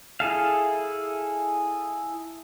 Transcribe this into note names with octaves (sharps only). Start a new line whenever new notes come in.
E4 G#4 A4 F5